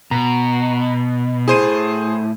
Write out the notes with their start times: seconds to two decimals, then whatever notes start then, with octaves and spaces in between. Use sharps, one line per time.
0.11 B2 A#5
1.48 A2 E4 G#4 C5 D#7